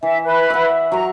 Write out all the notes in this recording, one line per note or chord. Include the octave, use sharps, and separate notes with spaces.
E3 E5
B4
E5 F#5
F#3 A#5 C#6